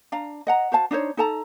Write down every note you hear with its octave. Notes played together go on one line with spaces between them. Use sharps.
D4 F5 A#5
D#5 F#5 A#5
F#4 C5 F5 A5
D4 D#4 C5 C#5
D#4 A4 A5 A#5